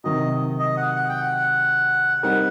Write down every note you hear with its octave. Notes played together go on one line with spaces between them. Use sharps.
C3 D#3 F#3 D#5
D#5
F#5
F#5
G5
F#5
G3 C4 D#4 G4 A#4 F#5